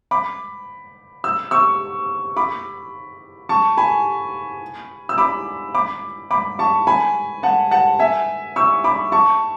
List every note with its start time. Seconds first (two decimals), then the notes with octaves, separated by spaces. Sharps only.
0.11 B5 D6
1.24 E6
1.51 C#6 E6
2.37 B5 D6
3.49 A5 C#6
3.77 G#5 B5
5.09 E6
5.18 B5 D6
5.74 B5 D6
6.31 B5 D6
6.59 A5 C#6
6.87 G#5 B5
7.43 F#5 A5
7.71 F#5 A5
7.99 E5 G#5
8.56 C#6 E6
8.84 B5 D6
9.12 A5 C#6